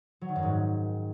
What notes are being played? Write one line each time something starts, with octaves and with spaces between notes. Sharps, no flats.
F#3
D#3
F#2
G#2